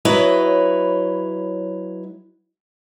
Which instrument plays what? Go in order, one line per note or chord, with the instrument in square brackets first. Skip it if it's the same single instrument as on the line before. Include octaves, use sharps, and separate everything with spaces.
[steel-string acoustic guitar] F#3 E4 B4 C#5 D#5